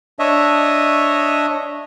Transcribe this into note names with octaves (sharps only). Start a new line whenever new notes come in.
D4 C#5 D#5 E5